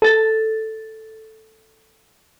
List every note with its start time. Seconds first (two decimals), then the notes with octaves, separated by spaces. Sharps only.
0.02 A4 A6